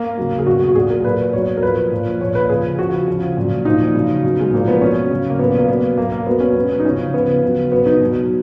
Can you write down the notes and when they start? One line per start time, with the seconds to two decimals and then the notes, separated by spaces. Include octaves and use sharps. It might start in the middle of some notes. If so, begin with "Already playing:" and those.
Already playing: A#3
0.18 C#3 F#3
0.39 G#4
0.46 B2 F#3 F#4
0.69 F#4
0.75 A#2 F#3 G#4
0.90 A#4
1.04 A#2 F#3 B4
1.33 B2 F#3 C#5
1.57 A#4
1.63 A#2 F3 B4
1.92 A#2 F3
2.21 A#2 F3 C#5
2.35 B4
2.49 C#3 F3 G#4
2.78 C#3 F3 F#4
3.08 C#3 F3
3.37 A#2 F#3
3.65 A#2 F3 D#4
3.95 C#3 F#3
4.23 B2 F#3
4.40 G#3
4.53 A#2 F3 A#3
4.68 B3
4.81 B2 F#3 C#4
5.10 C#3 F#3
5.30 A#3
5.39 A#2 F#3 B3
5.59 A#3
5.68 B2 F#3 B3
5.98 B2 F#3 A#3
6.12 A#3
6.26 B2 F#3 B3
6.40 C#4
6.54 B2 F#3 B3
6.80 D#4
6.85 C#3 F3 C#4
7.14 C#3 F3 B3
7.43 C#3 F#3
7.72 B2 F#3 B3
7.86 D#4
8.00 B2 F#3